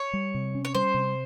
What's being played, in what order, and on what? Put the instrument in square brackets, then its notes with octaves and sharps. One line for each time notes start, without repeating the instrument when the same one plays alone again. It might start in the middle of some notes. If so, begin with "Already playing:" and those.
Already playing: [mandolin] C#5
[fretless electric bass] G3
C3
C#4
[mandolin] C#5
[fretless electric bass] G3 [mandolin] C5
[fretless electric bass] C3